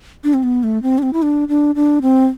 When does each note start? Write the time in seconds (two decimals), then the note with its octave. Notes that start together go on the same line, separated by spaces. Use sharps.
0.24 D4
0.34 C4
0.43 B3
0.63 A3
0.83 C4
0.98 D4
1.03 C4
1.13 E4
1.22 D4
1.48 D4
1.75 D4
2.02 C4